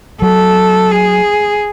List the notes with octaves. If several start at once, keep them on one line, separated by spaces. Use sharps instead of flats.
F#3 A4
G#4